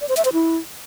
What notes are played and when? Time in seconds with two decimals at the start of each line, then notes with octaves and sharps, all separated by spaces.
0.01 D5
0.09 C5
0.17 E5
0.25 C5
0.33 E4